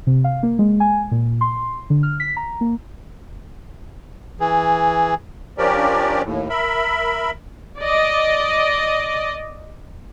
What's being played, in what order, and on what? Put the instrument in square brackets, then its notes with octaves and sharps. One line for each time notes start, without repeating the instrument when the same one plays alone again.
[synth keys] C3
F5
A#3
G#3
G#5
A#2
C6
D3
F6
B6
A#5
A#3
[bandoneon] E3 G#4
[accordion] F3 C#4 D4 G4 A#4 D5
D#2 A2
A#4 E5 B5
[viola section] D5 D#5